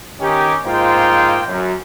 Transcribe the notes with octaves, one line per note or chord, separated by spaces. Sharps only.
D#3 C#4 D#4 G4
G#2 A#3 D#4 F4 C5 G5
F#2